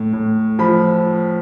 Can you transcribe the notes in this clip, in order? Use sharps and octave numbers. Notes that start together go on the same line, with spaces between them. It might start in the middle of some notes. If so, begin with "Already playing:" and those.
Already playing: A2
A2
F3 B5